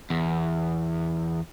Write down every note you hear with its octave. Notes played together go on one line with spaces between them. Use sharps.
E2